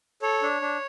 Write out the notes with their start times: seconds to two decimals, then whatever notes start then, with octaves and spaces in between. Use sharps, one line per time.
0.22 A4 C#5
0.42 D4
0.62 D4